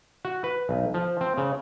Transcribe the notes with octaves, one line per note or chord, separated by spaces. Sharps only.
F#4
B4
B1
F3
C4
C#3